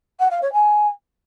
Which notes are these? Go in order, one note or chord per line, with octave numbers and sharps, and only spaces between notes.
F#5
F5
C#5
G#5